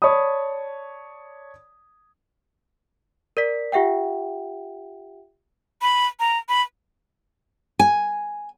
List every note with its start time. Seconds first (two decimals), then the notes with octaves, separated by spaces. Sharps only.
0.02 C#5 D5 A5 B5 D#6
3.37 A#4 D5 B6
3.72 F4 G4 E5 F#5 G5
5.82 B5
6.20 A#5
6.49 B5
7.79 G#5